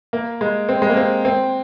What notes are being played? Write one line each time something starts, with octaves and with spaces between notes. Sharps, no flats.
A#3
G#3
C4
G#3
A#3
C4
C4